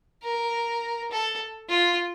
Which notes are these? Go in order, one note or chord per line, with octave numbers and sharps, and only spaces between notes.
A#4
A4
F4